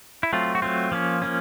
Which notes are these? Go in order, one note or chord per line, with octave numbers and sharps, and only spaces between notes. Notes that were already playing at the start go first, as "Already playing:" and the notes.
E4
F#3 A3 C4 F4
F#4
F#3 A3 C4 F4
F3 A#3 C#4
F3 A#3 C#4